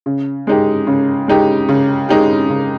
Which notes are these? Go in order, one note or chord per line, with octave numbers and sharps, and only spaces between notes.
C#3
G#3 D#4 G4
C#3
G#3 D#4 G4
C#3
G#3 D#4 G4
C#3